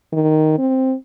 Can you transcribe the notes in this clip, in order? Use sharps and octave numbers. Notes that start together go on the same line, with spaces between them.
D#3
C4